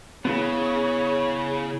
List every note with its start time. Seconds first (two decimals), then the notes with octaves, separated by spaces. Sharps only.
0.25 C#3 B3 E4 G#4 C#5